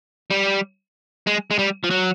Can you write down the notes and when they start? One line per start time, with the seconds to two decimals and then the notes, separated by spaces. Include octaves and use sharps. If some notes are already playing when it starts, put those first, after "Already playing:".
0.31 G3
1.27 G#3
1.51 G#3
1.59 G3
1.84 F3
1.91 F#3